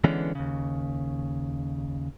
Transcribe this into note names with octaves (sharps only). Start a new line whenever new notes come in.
D3 E3 G#3 B3 C#4 D4
D#2 C#3